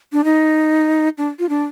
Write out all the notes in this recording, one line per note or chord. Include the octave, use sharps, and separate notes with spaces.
D4
D#4
D4
F4
D4